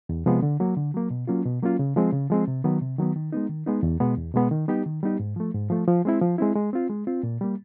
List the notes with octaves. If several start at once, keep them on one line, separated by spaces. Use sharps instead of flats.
E2
C3 F3 G#3 B3
D3
F#3 A#3
D3
F#3 A#3
B2
F#3 A#3 C#4 F4
B2
F#3 A#3 C#4 F4
C#3
F3 G#3 C4
C#3
F3 G#3 C4
C3
D#3 F#3 B3
C3
D#3 F#3 B3
D#3
G#3 B3 D#4
D#3
G#3 B3 D#4
E2
B2 G#3 B3
E2
B2 G#3 B3
D#3
G3 B3 D#4 G4
D#3
G3 B3 D#4 G4
G#2
F3 A3
G#2
F3 A3
F3
G#3 C4 E4
F3
G#3 C4 E4
G#3
C4 F4
G#3
C4 F4
A#2
G3 A#3